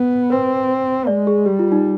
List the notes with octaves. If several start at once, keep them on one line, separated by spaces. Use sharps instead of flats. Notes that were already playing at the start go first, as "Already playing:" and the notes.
Already playing: B3
C4 B4
G#3 D5
G#4
G3 G4
F4
D#4